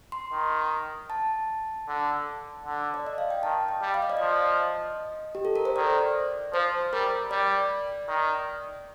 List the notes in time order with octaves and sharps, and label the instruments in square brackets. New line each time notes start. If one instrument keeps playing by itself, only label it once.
[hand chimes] C6
[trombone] D#3
[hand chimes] A5
[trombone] D3
D3
[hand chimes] D5
D#5
F5
G5
[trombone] D#3 [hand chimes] A5
[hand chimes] G5
[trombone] G3
[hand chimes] F5
D#5
D5
[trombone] F3 [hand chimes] D#5
[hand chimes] G4
A4
A#4
C5
[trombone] D#3 [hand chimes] D5
[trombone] F3 [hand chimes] C5
[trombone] G3 [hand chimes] A#4
[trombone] G3 [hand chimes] D5
[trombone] D#3